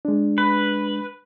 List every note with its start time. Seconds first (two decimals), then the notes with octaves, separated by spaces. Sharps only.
0.05 G#3 D4
0.38 B4